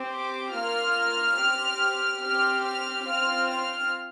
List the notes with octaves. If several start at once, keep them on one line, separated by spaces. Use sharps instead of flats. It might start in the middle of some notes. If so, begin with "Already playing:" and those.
Already playing: C4 G4
D6
A#3 F4 F6
C4 G4
C4 G4 F6
F6
C4 F4 F6
F6